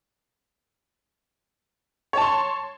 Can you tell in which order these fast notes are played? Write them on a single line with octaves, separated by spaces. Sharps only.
C#5 A5 C6